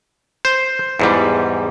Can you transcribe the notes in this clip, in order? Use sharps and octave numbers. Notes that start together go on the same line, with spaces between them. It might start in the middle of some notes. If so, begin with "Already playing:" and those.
C5
E2 G#2 G3